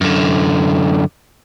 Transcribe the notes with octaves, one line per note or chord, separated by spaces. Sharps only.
F#2 D3